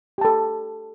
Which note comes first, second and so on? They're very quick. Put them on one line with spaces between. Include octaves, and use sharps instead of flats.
G4 A5 A4